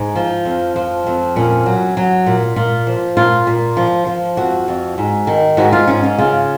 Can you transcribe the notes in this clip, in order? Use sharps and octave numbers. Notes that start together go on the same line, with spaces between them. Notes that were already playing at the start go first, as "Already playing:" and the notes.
Already playing: G#2
F3
F2
F3
F2
A#2 C#4
F#3
F#3
A#2
A#2 F4
F3
A#2 F4
A#2
F3
F3
F2 F#4
F2
G#2
D#3
G#2 F#4
F4
G#2 C#4
C#4
C#3 F4